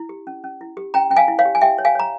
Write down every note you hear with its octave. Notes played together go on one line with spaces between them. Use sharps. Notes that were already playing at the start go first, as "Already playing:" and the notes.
Already playing: E4
G4
C#4
C#4
E4
G4
C#4 G5 A#5
C#4 G5
F5 G#5
E4
C#5 F5
G4
G#5
G4 E5 G5
C#5
F5 G#5
C#5 A#5